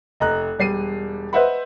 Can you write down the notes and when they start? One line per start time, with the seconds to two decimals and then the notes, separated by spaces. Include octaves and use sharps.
0.20 F1 D#5 A#5 F#6
0.59 E1 G3 C7 D#7
1.33 B4 C5 D#5 E5 F#5 B5